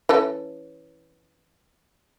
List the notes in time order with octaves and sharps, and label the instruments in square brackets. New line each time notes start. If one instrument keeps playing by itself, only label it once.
[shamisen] E3 C#4 A4